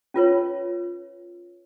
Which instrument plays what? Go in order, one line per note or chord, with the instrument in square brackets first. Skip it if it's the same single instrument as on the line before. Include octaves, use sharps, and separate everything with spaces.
[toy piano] C#4 F4 B4 C#5